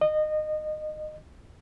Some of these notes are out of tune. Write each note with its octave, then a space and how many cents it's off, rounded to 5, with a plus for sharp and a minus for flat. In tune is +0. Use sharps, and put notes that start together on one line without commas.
D#5 -20